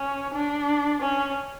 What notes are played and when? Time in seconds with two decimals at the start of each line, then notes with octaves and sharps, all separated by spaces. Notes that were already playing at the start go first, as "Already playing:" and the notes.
Already playing: C#4
0.34 D4
1.02 C#4